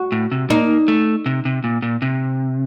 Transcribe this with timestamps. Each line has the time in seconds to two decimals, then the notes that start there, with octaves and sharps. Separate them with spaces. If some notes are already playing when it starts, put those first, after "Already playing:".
Already playing: F#4
0.12 A2
0.32 C3
0.50 A#3 D#4
0.88 A3
1.26 C3
1.45 C3
1.64 A#2
1.82 A#2
2.02 C3